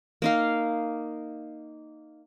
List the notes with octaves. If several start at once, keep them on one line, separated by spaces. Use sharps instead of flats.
A#3 D#4 F5